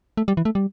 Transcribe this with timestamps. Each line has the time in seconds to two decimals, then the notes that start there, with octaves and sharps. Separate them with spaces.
0.17 A3
0.28 G3
0.37 E3
0.45 A3
0.55 G3